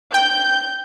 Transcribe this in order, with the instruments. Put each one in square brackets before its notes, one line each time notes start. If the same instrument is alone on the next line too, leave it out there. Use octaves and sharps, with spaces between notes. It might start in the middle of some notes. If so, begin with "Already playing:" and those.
[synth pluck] G5 [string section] G6